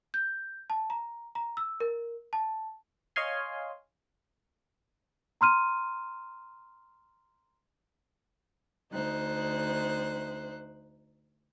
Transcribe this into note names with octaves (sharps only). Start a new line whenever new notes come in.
G6
A5
A#5
A#5
E6
A#4
A5
C#5 D#5 F5 G#5 C6
A#5 C6 F6 D#7
D2 D#4 C5 F#6